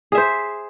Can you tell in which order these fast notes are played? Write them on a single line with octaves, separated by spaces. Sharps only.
G#4 E5 C5